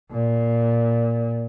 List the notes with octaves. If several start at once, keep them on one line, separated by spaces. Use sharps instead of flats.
A#2